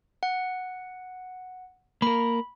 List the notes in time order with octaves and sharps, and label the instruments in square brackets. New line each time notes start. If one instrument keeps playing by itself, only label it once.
[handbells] F#5
[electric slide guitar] A#3 A#4 [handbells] B5